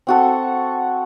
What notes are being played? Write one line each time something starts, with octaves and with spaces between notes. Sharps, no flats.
C4 F#4 A4